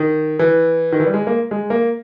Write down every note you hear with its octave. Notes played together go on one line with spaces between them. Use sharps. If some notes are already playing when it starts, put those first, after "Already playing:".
Already playing: D#3
E3
D#3
E3
G3
G#3
A#3
G#3
A#3